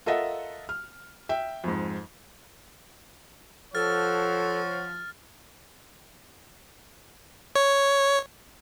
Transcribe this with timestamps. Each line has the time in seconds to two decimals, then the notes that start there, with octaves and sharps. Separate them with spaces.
0.06 F4 A4 A#4 D#5 E5 F#5
0.69 F6
1.29 E5 G5
1.64 F2 G#2
3.75 F3 A4 C#5 F#5 F6 A6
7.55 C#5